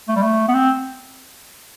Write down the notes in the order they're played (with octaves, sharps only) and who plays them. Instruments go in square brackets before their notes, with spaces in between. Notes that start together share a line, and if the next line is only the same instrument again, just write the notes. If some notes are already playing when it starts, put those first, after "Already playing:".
[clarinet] A3
G3
A3
B3
C4